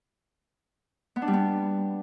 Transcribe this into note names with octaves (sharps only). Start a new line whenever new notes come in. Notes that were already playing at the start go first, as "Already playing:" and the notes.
B3
D4
G3
B3